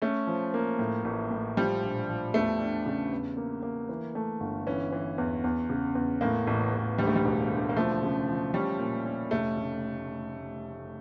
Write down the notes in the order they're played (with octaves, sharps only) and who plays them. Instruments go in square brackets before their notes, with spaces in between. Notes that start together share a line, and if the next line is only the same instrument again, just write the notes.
[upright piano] A3 [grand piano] C#4
[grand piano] F3
A#3
A2
A1
A2
[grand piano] F3 [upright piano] G3
[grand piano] A#1
F3
[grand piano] E2 [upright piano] A3
[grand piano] D4
C#3
E2
A#3
A#3
E3
A3
G1
[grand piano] E3 [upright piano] C#4
[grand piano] E3
E2
E2
C#3
E2
[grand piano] A2 [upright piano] A#3
[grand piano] A1
A1
[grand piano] D2 [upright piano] G3
[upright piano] A3
G3
[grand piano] E1
D3
[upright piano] A#3
[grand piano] F3 [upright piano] A3
[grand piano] C#3
F3
[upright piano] G3 [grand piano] C#4
[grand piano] A#2
C#4
[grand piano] F1 [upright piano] A3
[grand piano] C#3